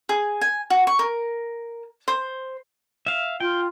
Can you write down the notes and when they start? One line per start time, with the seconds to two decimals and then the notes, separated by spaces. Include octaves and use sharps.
0.09 G#4
0.41 G#5
0.70 F#4
0.87 C#6
0.99 A#4
2.08 C5
3.06 E5 F5
3.40 F4 G5